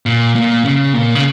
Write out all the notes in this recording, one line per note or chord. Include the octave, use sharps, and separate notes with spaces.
A#2
A#2
C#3
A#2
C#3